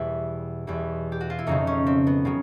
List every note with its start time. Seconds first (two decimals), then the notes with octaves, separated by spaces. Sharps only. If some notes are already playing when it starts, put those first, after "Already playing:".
Already playing: E2 B2 G3 E4
0.67 E2 B2 G3 E4
1.12 G4
1.21 F#4
1.30 F4
1.39 E4
1.47 F2 C#3 F#3 D#4
1.67 C#4
1.87 C4
2.07 B3
2.25 C#3 F#3